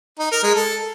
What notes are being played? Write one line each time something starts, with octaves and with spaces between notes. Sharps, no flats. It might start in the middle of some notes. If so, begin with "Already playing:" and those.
D#4
A#4
G#3
A4